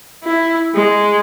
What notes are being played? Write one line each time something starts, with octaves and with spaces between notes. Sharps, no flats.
E4
G#3